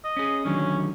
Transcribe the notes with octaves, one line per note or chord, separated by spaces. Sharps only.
D#5
C#4 G#4
D3 D#3 F#3 C#4